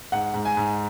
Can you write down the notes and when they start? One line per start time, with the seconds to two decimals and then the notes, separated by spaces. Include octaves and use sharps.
0.12 G#2 F#5
0.34 G#2
0.45 G#5
0.57 G#2